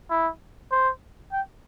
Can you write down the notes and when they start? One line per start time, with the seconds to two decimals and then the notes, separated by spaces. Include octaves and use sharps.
0.11 E4
0.71 C5
1.32 G5